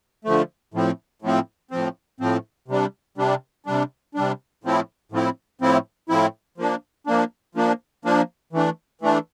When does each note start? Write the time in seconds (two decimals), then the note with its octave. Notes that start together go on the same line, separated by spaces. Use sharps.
0.25 D3 F3 A3
0.74 A2 F3 C4
1.22 A2 F3 C4
1.71 A2 F3 C4
2.20 A2 F3 C4
2.68 C3 G3 D4
3.18 C3 G3 D4
3.66 C3 G3 D4
4.15 C3 G3 D4
4.64 A2 F3 C4 E4
5.12 A2 F3 C4 E4
5.61 A2 F3 C4 E4
6.09 A2 F3 C4 E4
6.58 F3 A#3 D4
7.07 F3 A#3 D4
7.55 F3 A#3 D4
8.05 F3 A#3 D4
8.53 E3 A3 D4
9.01 E3 A3 D4